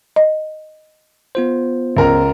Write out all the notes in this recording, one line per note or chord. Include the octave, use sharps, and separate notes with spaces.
D#5
B3 F4 C5
C#2 A#4 A#5